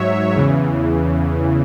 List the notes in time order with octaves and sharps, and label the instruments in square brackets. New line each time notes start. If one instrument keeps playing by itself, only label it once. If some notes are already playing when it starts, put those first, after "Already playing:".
Already playing: [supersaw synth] G#2 F#3 C#5 E5
E2 C#3 E3